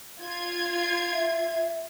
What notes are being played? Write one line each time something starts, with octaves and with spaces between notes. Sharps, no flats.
F4 G#6
E5